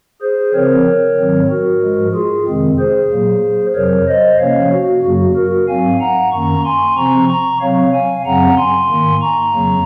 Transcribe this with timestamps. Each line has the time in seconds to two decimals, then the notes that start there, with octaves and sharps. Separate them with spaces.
0.22 G#4 C5
0.54 C#3 F3 C4 A#4 C#5
1.19 G#2 D#3 F#3 C4
1.50 F#4 A#4
1.82 G#2 F3 G#3
2.14 F4 G#4
2.47 F2 C3 D#3 G#3 C4
2.79 G#4 C5
3.11 A#2 F#3 A#3
3.75 F2 C3 F#3 A#4 C#5
4.07 C5 D#5
4.39 C3 F3 A#3 C#4 C#5 F5
4.72 F#4
5.03 F#2 C#3 F#3 A#3 F#4
5.36 F#4 A#4
5.68 G#2 F#3 C4 F5 G#5
6.00 F#5 A#5
6.32 F#2 D#3 A#3 C#4 A#5 C#6
6.64 G#5 C6
6.97 C3 F3 C4 A#5 C#6
7.29 A#5 C#6
7.61 C3 F#3 C4 C#5 F5
7.93 F5 G#5
8.25 F#2 C#3 F#3 C4 F#5 A#5
8.57 G#5 C6
8.89 G#2 D#3 A#3
9.21 A#5 C#6
9.53 F2 C#3 F#3 A#3